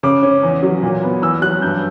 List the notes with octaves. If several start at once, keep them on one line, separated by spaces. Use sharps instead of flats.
C#3 D6
C#4
E2
F#3
A#2
B3
E2 E6
F#3 F#6
G2 G6